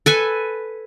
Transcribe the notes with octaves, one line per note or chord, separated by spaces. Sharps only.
A4 B4 G#5